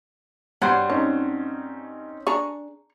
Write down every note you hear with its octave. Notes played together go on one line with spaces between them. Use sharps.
G2 F#3 G3 C5 F#5
C4 C#4 D#4 C#5
D4 G#4 A#5 C#6